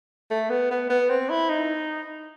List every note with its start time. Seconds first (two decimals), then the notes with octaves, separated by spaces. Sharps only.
0.31 A3
0.50 B3
0.71 B3
0.90 B3
1.10 C4
1.30 E4
1.49 D#4